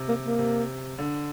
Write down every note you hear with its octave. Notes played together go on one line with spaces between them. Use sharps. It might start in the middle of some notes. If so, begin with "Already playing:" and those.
Already playing: C3
A#3
A#3
C3
D3